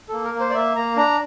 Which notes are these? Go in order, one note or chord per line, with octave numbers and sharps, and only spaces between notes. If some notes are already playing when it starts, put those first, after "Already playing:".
A#3 A4
A#4
A#3
C5
D5
A#3 E5
A#3 A#5
D4 A#5